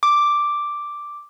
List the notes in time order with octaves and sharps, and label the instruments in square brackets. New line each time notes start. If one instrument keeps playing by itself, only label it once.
[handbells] D6